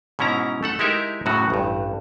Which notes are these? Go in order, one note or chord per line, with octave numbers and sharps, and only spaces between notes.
G#2 B2 C#4 E4 A#5
A3 A4 F#5
G#3 D#4 E4 G4 A#4 E5
F#2 A2 C#3 F#3 F#4
A1 G2